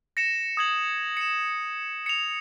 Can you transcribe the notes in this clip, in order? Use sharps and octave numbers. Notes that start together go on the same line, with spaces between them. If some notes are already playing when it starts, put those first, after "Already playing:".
A#6 C#7 E7
D#6 G#6 F#7
C#7 E7
C#7 F7